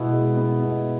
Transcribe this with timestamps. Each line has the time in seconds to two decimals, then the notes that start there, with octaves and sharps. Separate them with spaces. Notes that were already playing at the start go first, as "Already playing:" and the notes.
Already playing: B2 G#3 B3 E4
0.12 G#3
0.37 B3
0.62 B2